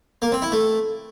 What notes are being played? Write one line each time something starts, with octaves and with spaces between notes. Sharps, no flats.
A#3
C4
E4
A3